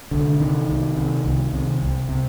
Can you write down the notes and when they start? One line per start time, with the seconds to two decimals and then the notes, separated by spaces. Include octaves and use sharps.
0.11 C2 D3
0.39 C3 D#3
0.68 C2
0.96 C3
1.25 C2
1.53 C3
1.81 C2
2.09 C3